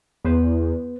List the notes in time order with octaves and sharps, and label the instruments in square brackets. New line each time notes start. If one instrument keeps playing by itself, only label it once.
[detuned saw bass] E2 [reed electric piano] B3 B4 C5